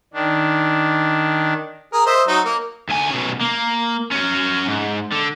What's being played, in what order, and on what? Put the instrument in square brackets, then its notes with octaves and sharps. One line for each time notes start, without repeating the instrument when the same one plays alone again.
[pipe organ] D#3 D4
[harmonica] G#4 A#4
C5 D#5 E5
F#3 D#4
A#3
[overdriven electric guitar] D2 G#5
B2 C#4
A#3
C#4 F#4
G#2
D3